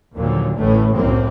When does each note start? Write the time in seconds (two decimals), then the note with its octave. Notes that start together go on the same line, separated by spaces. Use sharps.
0.16 D#2 A#2 D3 F3 F#3
0.58 A1 A2 E3 A3
0.94 C2 F#2 A2 A#3 C4